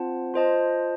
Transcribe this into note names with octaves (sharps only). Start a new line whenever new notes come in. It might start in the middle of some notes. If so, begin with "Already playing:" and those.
Already playing: C4 F4 C5 F#5 A5
F4 C5 D#5 A5